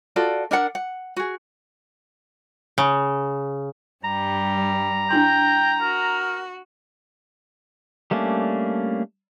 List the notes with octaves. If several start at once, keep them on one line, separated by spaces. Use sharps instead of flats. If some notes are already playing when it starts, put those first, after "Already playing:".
F4 F#4 A4 D5
D4 A#4 D5 F#5
F#5
F#4 G#4
C#3
G2 G3 A#5
D4 E4 G5 C6
F#4 A#4
G3 A3 A#3 C#4 D4